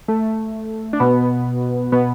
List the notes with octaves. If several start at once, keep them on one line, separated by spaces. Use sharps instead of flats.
A3
D4
B2 B3
B2 B3